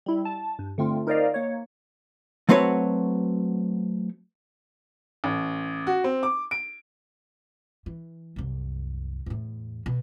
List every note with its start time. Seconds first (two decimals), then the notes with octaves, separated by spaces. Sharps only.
0.06 G3 E4
0.25 A5
0.59 G2
0.78 D3 A3 C4 F4
1.07 D#4 A#4 C5 D5 D#5 F5
1.34 A#3 C#5
2.49 F#3 A3 C4 F#4 B4 C#5
5.24 A1
5.87 F#4
6.04 C4
6.23 D6
6.51 D7
7.86 E3
8.36 C2 F#2
9.26 E2 A2
9.86 B2